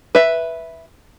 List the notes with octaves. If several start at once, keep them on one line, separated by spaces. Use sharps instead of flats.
B4 E5